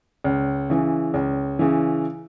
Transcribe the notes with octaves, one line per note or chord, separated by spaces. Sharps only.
C#2
C#3 E3
C#2
C#3 E3